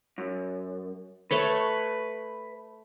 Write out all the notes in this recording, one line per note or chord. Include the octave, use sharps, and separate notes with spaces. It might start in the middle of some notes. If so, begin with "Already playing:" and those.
F#2
A3 A4 B4 C#5